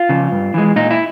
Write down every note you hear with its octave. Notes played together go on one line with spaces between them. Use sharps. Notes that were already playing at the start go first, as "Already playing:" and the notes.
Already playing: F4
C#3 F3
G2
E3 G#3
A#2 D#4
E4